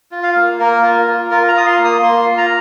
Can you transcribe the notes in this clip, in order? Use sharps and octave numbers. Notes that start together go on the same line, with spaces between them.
F4
F5
A#3
A#3 A#4
F4
F4
F4 A#4
A#5
F4 D#6
C6
A#3
D#6
A#3 C6
F4
A#5